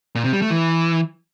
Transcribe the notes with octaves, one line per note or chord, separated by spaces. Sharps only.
A#2
C3
G3
A3
E3